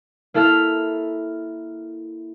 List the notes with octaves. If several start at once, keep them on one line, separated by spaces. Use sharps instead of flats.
A#3 E4 A4 E5 F6